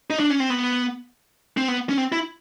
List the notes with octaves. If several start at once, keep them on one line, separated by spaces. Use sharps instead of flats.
D#4
D4
C#4
C4
B3
C4
B3
C#4
C4
E4